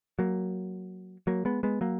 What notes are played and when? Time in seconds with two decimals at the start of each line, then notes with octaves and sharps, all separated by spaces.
0.19 F#3 A#3
1.27 F#3 A#3
1.45 G#3 B3
1.63 G#3 B3
1.81 F#3 A#3